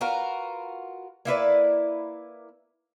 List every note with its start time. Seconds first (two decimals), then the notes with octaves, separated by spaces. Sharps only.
0.01 F4 F#4 A#4 B4
1.25 A#3 E4 B4 D5